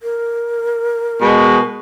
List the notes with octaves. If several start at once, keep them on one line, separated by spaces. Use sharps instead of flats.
A#4
B2 G#3